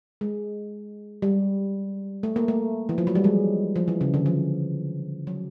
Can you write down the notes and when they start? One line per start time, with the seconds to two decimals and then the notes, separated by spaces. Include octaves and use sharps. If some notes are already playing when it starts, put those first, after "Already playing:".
0.21 G#3
1.22 G3
2.23 A3
2.36 A#3
2.48 A3
2.89 E3
2.98 F3
3.07 F#3
3.15 G3
3.24 G#3
3.76 F3
3.88 E3
4.01 C#3
4.14 D3
4.26 F3
5.27 F#3